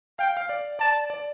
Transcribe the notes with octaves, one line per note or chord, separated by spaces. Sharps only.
F5 G5
F5
D5
D5 A5
D5